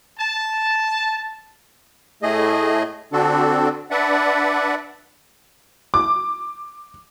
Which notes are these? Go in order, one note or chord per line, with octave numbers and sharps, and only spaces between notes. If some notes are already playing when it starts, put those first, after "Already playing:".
A5
A2 A3 G#4 D#5
D3 C4 D4 F#4 A4
D4 B4 D5 E5 F#5
D6